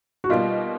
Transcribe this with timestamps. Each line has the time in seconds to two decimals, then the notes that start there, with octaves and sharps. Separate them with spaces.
0.24 F#4
0.29 B2 G3 A#3 D#4 F4